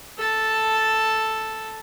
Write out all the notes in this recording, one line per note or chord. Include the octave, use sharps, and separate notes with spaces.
A4 A5